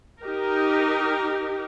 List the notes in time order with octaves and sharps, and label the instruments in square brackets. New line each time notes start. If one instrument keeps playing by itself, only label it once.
[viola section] D#4 G4 A#4